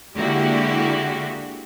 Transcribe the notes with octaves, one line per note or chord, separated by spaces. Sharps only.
D3 G#3 A#3 E4 F#4 G4